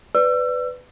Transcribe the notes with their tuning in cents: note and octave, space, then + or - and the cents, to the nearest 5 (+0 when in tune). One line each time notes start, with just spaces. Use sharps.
B4 +15 D5 +0 E6 +35